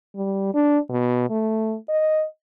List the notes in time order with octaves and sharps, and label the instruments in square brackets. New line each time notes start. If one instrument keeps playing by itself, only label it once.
[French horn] G3
D4
B2
A3
D#5